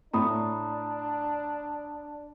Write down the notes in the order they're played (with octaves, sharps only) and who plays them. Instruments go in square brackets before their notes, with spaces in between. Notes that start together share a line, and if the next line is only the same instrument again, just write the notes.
[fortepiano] A2 [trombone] D4 [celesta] A#5 B5 D#6